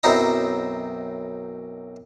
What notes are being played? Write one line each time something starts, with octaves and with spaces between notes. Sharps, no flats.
B1 F#2 C4 D#4 E4 A#5